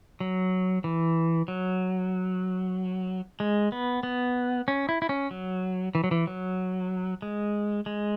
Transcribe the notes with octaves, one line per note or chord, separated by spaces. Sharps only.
F#3
E3
F#3
G#3
B3
B3
C#4
E4
E4
C#4
F#3
E3
F#3
E3
F#3
G#3
G#3